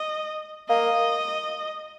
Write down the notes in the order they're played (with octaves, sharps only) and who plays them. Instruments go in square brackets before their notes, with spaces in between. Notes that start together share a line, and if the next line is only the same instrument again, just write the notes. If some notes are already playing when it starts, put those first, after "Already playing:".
Already playing: [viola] D#5
[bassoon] A#3 [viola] D#5